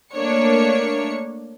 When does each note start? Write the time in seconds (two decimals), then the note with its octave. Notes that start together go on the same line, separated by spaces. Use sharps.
0.14 A3 A#3 D4 C#5 C#7